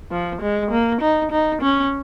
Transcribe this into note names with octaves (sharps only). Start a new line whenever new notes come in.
F3
G#3
A#3
D#4
D#4
C#4